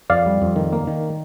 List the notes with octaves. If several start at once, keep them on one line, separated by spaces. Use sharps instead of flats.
F2 D5 F5
G3
F2
D#3
A#3
D#3